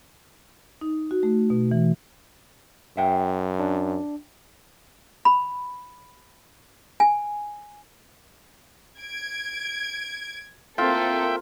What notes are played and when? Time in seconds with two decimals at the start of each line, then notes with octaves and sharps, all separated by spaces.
0.81 D#4
1.11 F#4
1.23 A3
1.50 B2
1.71 E3
2.97 F#2 E5 G5
3.60 D4
5.25 B5
7.00 G#5
9.00 G#6 D7
10.78 A#3 C4 F4 A4 E5 G5